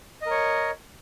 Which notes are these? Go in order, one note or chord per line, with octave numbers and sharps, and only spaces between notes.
A#4 C#5 D#5